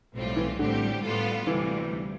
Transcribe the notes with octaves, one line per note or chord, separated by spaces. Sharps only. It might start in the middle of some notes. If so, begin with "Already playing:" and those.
B1 A2 G3 C4 F4
E3
A1 A2 D3 G3 C4 G4
A2 G3 B3 F4 A4
D2 C3 E3 G3